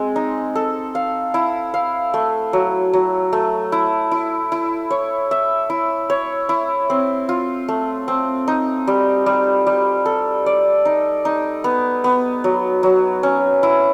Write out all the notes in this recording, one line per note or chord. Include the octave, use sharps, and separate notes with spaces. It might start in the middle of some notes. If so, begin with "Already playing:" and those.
Already playing: G#3 C4
D#4
A4
F5
E4
F5
A3
F#3
F#3
A3
E4
E4
E4
C#5
E5
E4
C#5
E4
C4
F4
A3
C4
D#4
G3
G3
G3
A4
D5
D#4
D#4
B3
B3
F#3
F#3
C#4
E4